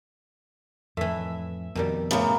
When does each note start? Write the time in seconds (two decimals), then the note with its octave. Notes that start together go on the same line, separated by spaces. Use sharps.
0.97 F2 A2 E3 E5
1.75 F2 B2 D#3 G3
2.11 A2 C#3 A#3 B3 B5